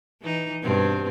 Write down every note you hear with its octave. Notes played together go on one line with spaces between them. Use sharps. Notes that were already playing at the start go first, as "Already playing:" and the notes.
E3 D#4
G2 B2 C4